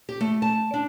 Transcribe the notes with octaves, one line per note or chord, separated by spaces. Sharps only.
G4
A3
A5
D4